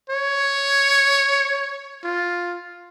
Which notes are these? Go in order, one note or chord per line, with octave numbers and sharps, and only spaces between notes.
C#5
F4